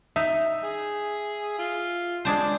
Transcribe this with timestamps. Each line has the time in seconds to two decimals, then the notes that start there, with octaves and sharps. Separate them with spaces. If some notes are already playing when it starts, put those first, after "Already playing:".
0.16 D#4 E5
0.64 G#4
1.59 F4
2.25 G#3 D4 C5